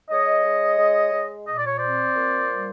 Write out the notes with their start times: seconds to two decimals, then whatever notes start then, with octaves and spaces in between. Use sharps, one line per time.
0.09 G#3 C#5 D#5
0.43 G#3
0.78 G#3
1.12 G#3
1.47 A#2 D#5
1.56 D5
1.66 C#5
1.77 C4 C5 D5
2.15 A#2
2.50 G3